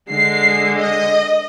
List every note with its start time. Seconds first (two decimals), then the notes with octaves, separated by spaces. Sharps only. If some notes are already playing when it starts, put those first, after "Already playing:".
0.10 D3 G#3 C7
0.78 D#5